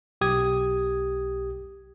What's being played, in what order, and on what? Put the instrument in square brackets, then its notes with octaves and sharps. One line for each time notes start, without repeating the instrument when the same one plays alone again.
[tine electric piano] B1 G4 D#6 G#6